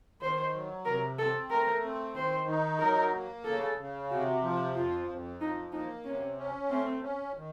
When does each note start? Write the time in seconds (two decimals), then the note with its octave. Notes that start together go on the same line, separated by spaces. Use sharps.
0.21 D#3 C5
0.54 F#3
0.86 C3 A#4
1.18 C4 A4
1.50 A3 A#4
1.84 C4
2.16 D#3 C5
2.48 D#4
2.80 F#3 A#4
3.13 A#3
3.45 C#3 A4
3.78 C#3
4.11 C3 F#4
4.43 F3
4.76 F2 F4
5.08 F2
5.40 F3 D#4
5.72 A#3 D#4
6.05 C3 C#4
6.38 C#4
6.70 A3 C4
7.02 C#4
7.35 D#3